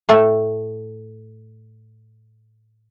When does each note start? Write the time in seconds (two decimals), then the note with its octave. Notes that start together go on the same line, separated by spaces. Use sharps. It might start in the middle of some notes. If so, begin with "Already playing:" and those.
0.09 A2 A3 A4